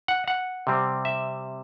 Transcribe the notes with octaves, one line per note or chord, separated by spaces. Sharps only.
F#5
F#5
C3 G3 C4
E5